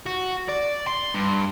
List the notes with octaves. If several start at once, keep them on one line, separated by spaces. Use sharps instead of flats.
F#4
D5
C6
G2